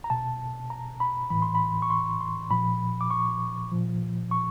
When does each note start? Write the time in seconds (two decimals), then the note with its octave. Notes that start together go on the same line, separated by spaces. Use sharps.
0.04 A#5
0.10 B2 A5
0.70 A#5
1.00 B5
1.30 A2 E3 B5
1.42 C6
1.55 B5
1.82 C#6
1.90 C6
2.21 C6
2.50 A#2 F3 B5
3.01 D6
3.10 C#6
3.71 A#2 F3
4.31 C#6